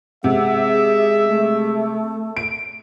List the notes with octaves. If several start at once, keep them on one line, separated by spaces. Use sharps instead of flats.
C3 G#3 E5 F#5
G#4
A3
D7